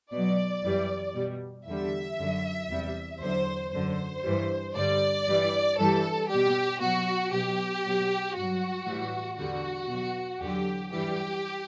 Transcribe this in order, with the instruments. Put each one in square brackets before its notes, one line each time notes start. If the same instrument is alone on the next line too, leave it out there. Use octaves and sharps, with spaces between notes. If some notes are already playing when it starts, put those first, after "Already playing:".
[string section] B2 F#3 D5
F#2 E3 G3
B2 G3
E2 D3 G3 E5
F#2 D3 F#3
E2 C3 G3
E2 D3 F#3 C5
F#2 D3 F#3 C5
G2 E3 G3
G2 D3 G3 D5
G2 E3 G3
G2 E3 G3 A4
B2 G3 G4
B2 F#3 F#4
B2 F#3 G4
B2 F#3
G2 F#3 F#4
A2 E3 G3
E2 D3 G3 F#4
B2 F#3
E2 D3 F#3 G4
G2 E3 G3 G4